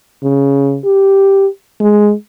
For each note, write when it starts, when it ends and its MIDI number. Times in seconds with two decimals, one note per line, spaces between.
0.23 0.79 49
0.85 1.47 67
1.80 2.13 56